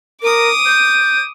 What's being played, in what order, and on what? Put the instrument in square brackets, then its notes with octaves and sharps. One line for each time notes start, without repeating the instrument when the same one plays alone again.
[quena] A#4 [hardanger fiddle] D6 D#6
[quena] G6